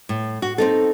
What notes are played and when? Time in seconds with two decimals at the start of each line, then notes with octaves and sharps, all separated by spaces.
0.09 A2
0.42 F#4
0.58 C4 D#4 A4